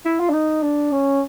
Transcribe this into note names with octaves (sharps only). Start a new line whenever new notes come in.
E4
F4
D4
D#4
D4
C#4